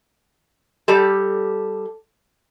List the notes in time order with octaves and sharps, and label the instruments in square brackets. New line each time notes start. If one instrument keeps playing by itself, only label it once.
[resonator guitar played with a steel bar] G3 G4 A4